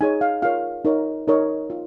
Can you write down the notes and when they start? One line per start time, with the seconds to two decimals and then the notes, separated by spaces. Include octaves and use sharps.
0.01 D#4 G#4 C#5 G#5
0.21 F5
0.42 F4 A#4 C#5 F5
0.85 D#4 A#4 C#5
1.28 D#4 A#4 C#5 D#5
1.70 F4